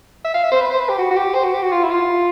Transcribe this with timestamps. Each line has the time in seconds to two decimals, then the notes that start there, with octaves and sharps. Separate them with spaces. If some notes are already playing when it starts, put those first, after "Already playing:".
0.25 E5
0.34 F5
0.44 E5
0.52 C5
0.61 B4
0.70 C5
0.79 B4
0.89 G4
0.98 F#4
1.10 F#4
1.16 G4
1.35 C5
1.44 F#4
1.54 G4
1.62 F#4
1.72 F4
1.83 E4
1.90 F4